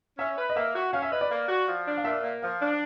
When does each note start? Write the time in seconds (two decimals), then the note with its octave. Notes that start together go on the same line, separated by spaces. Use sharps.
0.18 C#4 E5
0.37 B4
0.50 D#5
0.56 A#3 E5
0.74 F#4
0.93 C#4 F5
1.02 E5
1.12 B4 D#5
1.21 D5
1.30 A#3
1.49 F#4
1.68 F3
1.87 D4
1.97 F5
2.04 A#2 E5
2.23 A#3
2.42 F3 F5
2.61 D4